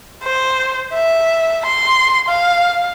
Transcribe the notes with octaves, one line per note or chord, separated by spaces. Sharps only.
C5
E5
C6
F5